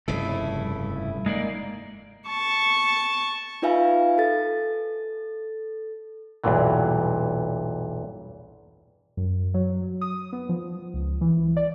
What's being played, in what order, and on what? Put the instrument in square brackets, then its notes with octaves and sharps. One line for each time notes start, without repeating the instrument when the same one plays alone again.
[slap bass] F1 C#3 [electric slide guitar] G2 [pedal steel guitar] E4 A4
[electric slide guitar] G#3 A#3 D5 [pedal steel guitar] D#4
[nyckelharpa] A5 C#6
[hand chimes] D#4 F4 B4 E5 F5 G#5
A4 A6
[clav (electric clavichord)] B1 E2 G2 A#2 E3
[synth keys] F#2
F#3
D#6
B3
F3
C#2
E3
D5